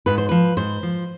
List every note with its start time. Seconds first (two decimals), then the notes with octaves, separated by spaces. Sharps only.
0.06 G#2 B4
0.18 C5
0.29 F3 B4
0.57 G#2 C5
0.83 F3